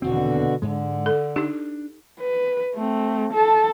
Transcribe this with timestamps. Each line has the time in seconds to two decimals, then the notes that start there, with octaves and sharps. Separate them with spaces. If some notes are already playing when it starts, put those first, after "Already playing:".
0.02 D#1 E2 B2 D3 C4 F#4
0.62 G#2 D3 G#3
1.06 A4
1.36 D4 D#4 G4
2.20 B4
2.75 A3 C4
3.33 A4 A5